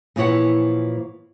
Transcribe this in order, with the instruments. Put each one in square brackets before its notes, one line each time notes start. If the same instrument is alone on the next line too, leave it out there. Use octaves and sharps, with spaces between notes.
[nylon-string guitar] A#2 E3 F3 E4 C#5 F#5